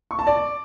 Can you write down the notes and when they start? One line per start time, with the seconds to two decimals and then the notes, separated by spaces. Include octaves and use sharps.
0.11 C#6
0.19 A5
0.27 D5